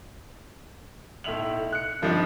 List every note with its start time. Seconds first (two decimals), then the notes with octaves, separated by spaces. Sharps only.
1.24 B1 A2 E5 F7 F#7
1.72 F#6 C#7
2.02 G2 F3 G3 C4 D4 D#4